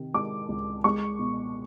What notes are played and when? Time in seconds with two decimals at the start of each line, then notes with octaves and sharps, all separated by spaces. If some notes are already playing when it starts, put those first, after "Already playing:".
Already playing: C3 D#3
0.14 G#3 D6
0.49 C#2
0.84 G#3 C#6
1.19 B2